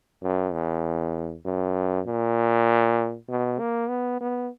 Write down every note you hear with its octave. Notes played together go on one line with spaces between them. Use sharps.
F#2
E2
F#2
A#2
B2
A#3
B3
B3